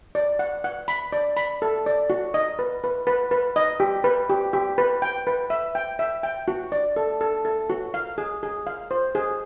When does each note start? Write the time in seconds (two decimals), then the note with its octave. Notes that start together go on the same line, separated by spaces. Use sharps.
0.15 D5
0.39 F#5
0.64 F#5
0.88 B5
1.12 D5
1.37 B5
1.62 A4
1.86 D5
2.10 F#4
2.34 D#5
2.59 B4
2.84 B4
3.07 B4
3.31 B4
3.56 D#5
3.80 G4
4.04 B4
4.30 G4
4.53 G4
4.78 B4
5.02 G5
5.27 B4
5.50 E5
5.75 G5
5.99 E5
6.23 G5
6.48 F#4
6.72 D5
6.96 A4
7.21 A4
7.45 A4
7.70 F#4
7.94 F5
8.18 G#4
8.43 G#4
8.67 F5
8.91 C5
9.15 G#4